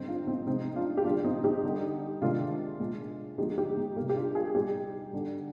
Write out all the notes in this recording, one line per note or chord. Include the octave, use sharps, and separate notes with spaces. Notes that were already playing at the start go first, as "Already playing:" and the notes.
Already playing: D3 G3 C4 D#4
D4 F4
C4 D#4
C3 F3 G#3 C4 D#4
D4 F4
G4
D3 G3 D4 F4
D4
C4 D#4
D#4 G4
D3 G3
C3 D#3 G#3 D4 F4
A#2 G#3
D3 F3 G#3 D#4 G4
D#4 G4
G#3
C3 G3 A#3
G4
D4 F4
F4 G#4
A#2 G3 D#4 G4
D3 G3